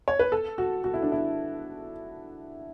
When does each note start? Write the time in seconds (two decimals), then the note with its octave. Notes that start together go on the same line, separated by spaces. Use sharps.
0.08 C#5
0.19 B4
0.32 A4
0.58 F#4
0.84 F#4
0.94 E4
1.02 D4
1.12 E4